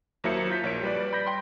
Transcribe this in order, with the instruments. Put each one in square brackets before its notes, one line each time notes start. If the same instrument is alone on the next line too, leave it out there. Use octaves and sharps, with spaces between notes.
[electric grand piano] D#2 F#3 A#3 E4 C5 C#7
F4 G6 B6
A#1 C#5 D7
G3 B4 D5
B5 G6 A#6 B6
G5 C6